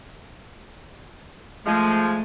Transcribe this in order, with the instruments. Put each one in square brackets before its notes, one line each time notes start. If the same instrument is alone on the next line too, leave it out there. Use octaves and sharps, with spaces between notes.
[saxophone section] F3 G#3 [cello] A3